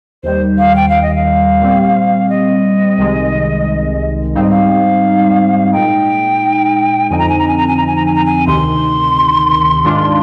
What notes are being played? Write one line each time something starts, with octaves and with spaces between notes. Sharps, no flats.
D#2 D#3 G3 C5
F5
G5
F5
D#5
F5
A#2 G3 C4
D#5
C2 C3 D#3 G#3
G#2 G3 C4 D#4 F5
D#5
F5
A#2 G#3 D#4 G5
F2 D3 F3 C4 D#4 G#5
A#5
G#5
A#5
G#5
A#5
G#5
A#5
G#5
A#5
G#5
A#5
G#5
D2 C3 D#3 C6
G#2 D#3 G#3 D4 F4